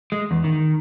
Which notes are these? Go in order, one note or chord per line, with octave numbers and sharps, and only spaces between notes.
G#3
E2
D#3